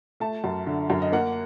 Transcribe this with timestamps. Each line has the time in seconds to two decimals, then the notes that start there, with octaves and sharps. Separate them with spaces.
0.20 A3 A5
0.44 F#2
0.66 D3
0.90 F#2
1.02 D#5
1.12 A#3 F#5